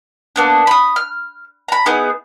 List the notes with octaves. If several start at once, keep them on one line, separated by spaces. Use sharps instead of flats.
A#3 B3 D4
B5 D#6
F6
A#5 B5
B3 D#4 E4 G#4